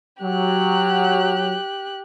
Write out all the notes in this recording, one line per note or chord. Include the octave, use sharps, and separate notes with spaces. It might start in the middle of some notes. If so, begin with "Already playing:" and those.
F#3 G4 F#6